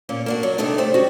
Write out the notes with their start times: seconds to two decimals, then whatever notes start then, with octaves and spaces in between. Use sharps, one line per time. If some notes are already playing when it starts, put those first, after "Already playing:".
0.09 A#2 A#3 C#4
0.26 A#3 D4 F#4
0.43 F#3
0.58 C3 D#3 G#3 A3 D4 G4
0.78 C5 D5 E5
0.94 F#3 G3 C#4 F#4